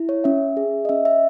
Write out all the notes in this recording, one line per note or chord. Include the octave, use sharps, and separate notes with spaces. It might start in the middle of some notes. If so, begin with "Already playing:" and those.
Already playing: E4
C#5
C#4 E5
G#4
D#5
C#4 E5
E5